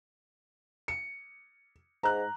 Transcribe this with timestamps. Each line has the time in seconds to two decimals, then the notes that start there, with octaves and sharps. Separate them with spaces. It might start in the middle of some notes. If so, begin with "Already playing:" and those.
0.88 C#7
2.03 G#2 A#5 F#6